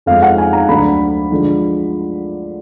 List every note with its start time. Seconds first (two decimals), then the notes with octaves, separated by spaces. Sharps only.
0.06 F2 F3 G#3 F5
0.23 F#5
0.38 G#5
0.53 A#5
0.68 D2 D3 F#3 B5
1.31 D3 F3 G#3